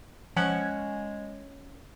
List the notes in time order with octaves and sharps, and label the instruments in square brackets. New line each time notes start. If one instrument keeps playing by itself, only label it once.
[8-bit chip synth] F3 [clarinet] G#3 [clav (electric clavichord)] C#4 F#5